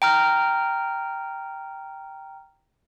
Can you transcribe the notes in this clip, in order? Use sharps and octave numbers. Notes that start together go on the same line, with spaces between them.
G5 A#5 F6